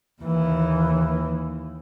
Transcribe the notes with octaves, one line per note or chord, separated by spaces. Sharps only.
D#2 E3